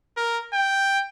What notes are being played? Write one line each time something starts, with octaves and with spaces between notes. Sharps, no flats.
A#4
G5